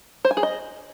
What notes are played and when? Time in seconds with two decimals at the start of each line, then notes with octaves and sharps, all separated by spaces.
0.25 C5
0.31 G#5
0.37 G#4
0.43 D#5